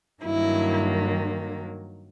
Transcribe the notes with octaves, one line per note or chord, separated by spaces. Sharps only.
G2 D#3 F#3 A#3 E4